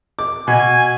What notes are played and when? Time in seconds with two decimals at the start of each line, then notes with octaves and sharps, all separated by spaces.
0.19 D6
0.48 B2 G#5